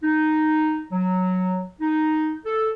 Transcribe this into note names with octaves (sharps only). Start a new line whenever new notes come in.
D#4
F#3
D#4
A4